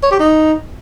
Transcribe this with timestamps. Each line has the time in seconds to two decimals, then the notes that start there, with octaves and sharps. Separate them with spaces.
0.03 C#5
0.11 G4
0.19 D#4